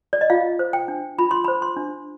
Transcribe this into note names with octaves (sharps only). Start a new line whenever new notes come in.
D5
D#5
F4 F5
C5
G5
D4
F4 B5
C6
C5 B5
C6
D4